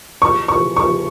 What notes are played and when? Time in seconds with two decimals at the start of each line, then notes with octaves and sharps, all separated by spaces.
0.22 C#6
0.48 C#6
0.76 C#6